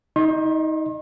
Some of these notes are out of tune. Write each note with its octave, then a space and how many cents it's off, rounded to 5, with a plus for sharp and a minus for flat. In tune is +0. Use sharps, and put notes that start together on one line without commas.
D#4 +30 D#5 -35 C6 +45